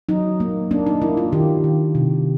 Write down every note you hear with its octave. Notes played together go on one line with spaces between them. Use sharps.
F#3 D#4
A#3
A#3 D4
D#4
A#3 E4
F4
D#3 G4
D#3
C3